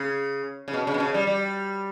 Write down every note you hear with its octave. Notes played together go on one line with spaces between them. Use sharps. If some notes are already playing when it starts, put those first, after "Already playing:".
Already playing: C#3
C#3
B2
C#3
B2
C#3
G3
G3